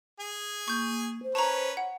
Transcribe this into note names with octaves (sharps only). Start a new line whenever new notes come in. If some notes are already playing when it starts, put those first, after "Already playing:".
G#4 G#5
A#3 C#6 G6
C5
C#4 B4 C#5 A5 A#5
F#5